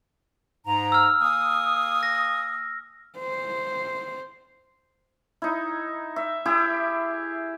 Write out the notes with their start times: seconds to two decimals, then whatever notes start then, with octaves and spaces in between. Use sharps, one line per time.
0.67 G#2 A#5
0.92 E6 F6
1.22 A#3 G#5 D#6
2.03 A#6
3.19 C5
5.42 D#4 E4
6.16 E5
6.46 E4 G4 G#4